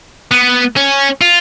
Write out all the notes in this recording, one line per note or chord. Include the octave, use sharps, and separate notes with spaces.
B3
C#4
F4